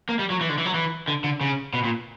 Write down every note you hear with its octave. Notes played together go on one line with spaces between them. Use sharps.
A#3
G3
F#3
E3
D3
E3
F#3
E3
D3
D3
C#3
B2
A#2